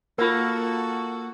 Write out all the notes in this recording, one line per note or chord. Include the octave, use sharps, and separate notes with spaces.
A#3 F4 F#4 A4 A#4